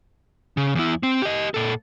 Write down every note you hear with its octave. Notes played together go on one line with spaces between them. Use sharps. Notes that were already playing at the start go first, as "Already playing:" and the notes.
C#3
E2 E4
C4
G4 D#5
A#2 A4